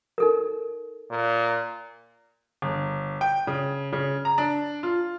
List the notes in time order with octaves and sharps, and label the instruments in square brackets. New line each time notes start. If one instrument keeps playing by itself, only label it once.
[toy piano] D#4 A4 A#4
[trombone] A#2
[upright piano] G1
G5
C#3
C#3
A#5
D4
F4